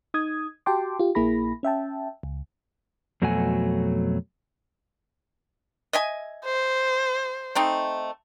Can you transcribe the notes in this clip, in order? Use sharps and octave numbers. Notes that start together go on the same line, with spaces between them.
D#4 D#6 G#6
F#4 G4 G5 A5 C6 D6
F4 G4
A#1 A#3 E4 G#4 B5 A#6
C#4 E5 G5 A5
C#2
F2 B2 F#3 A3 F#4 G#5
D#5 E5 G#5
C5
A3 C4 D#4